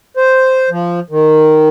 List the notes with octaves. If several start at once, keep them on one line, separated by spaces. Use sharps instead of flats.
C5
F3
D#3